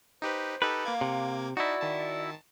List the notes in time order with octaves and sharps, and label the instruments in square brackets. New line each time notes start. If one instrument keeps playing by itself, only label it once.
[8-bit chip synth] D#4 G4 B4 [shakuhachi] C5
[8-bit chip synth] D#4 G4 A4 [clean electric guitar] B4
[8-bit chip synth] A#3 D6 G#6 [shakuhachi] F5
[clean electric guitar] C3
[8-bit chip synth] D#4 A5 [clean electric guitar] E4 F#4 [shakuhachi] D5
[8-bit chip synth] D#3 A5